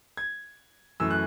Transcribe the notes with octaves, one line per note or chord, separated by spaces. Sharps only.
G#6
F#2 E3 A3 E6
F#6